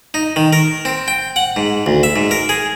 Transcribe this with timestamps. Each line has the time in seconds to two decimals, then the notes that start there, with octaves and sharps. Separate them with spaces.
0.14 D#4
0.36 D#3
0.53 A#4
0.85 C4
1.08 G5
1.36 F#5
1.56 G#2
1.86 D2
2.03 E5
2.16 G#2
2.31 A#4
2.49 G#4